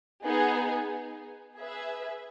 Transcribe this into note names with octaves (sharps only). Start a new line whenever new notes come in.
B3 D#4 G#4
G#4 B4 E5